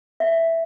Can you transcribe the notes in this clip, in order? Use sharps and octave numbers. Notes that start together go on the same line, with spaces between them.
E5